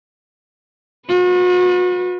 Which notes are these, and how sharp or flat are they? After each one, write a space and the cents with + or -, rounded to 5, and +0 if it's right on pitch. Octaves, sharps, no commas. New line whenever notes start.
F#4 -40 B4 +0